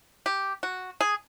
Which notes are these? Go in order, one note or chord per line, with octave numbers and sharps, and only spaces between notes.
G4
F#4
G#4